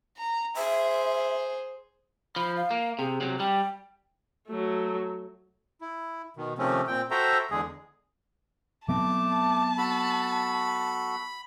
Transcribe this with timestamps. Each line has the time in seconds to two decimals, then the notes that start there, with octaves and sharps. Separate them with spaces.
0.17 A#5
0.57 G#4 C5 E5
2.36 F3 B5
2.56 F5
2.71 A#3
2.99 C3 G#4
3.21 C3 F#3
3.40 G3 G5
4.47 F#3 A3
5.81 E4
6.37 B2 D#3
6.58 C3 D#3 F3 A3 C4 C#4
6.88 A#2 C4 G5
7.11 F#4 A4 C5 E5 G5 A#5
7.51 E2 D3 G#3 G#4
8.88 F#3 A3 B3 C4 A5 D6
9.78 F#4 A4 B5